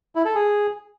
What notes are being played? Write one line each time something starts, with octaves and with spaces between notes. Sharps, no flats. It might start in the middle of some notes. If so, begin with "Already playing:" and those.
E4
A4
G#4